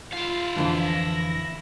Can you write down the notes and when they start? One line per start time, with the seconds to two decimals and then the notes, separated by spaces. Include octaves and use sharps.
0.13 E4 F4 F5
0.56 F2 D3 E3
0.86 A#6